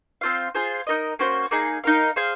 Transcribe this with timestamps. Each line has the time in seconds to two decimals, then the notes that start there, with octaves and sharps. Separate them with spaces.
0.21 C4 F4 C5 F5
0.55 F4 G#4 C5
0.87 D#4 A#4 D#5
1.19 A#3 C#4 F#4 C5
1.51 A#3 D#4 G#4
1.84 D#4 A#4 F5
2.16 G#4 C5 F5